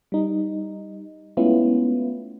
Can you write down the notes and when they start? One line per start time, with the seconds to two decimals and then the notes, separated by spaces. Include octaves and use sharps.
0.12 G3 D#4
1.37 G#3 A3 B3 C#4 E4 F4